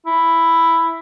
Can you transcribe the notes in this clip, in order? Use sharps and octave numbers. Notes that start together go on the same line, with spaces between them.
E4